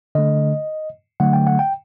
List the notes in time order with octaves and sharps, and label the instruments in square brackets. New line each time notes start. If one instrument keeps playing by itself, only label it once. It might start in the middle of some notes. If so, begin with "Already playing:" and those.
[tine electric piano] D3 A3 D#5
D3 F#3 A3 F#5
G5
F#5
G5